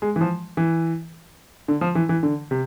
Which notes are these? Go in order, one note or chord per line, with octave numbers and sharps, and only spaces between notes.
G#3
E3
F3
E3
D3
F3
E3
E3
D3
C3